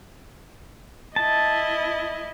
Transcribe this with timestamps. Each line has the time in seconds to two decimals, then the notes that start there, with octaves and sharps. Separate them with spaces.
1.16 E4 D#5 A5